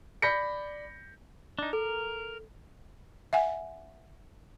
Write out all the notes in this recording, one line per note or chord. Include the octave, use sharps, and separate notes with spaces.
D5 B5 G6 A#6 B6 C#7
D4 D#4
A4 A#4
E5 F#5 G#5